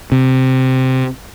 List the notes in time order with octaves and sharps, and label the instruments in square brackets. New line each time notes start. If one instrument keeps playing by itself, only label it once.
[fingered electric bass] C3